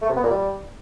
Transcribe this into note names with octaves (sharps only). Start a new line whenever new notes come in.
A3
C3
B3
A#2
G3